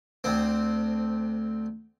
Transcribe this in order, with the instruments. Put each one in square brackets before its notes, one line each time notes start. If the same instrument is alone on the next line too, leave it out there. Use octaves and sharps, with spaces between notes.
[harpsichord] D2 C4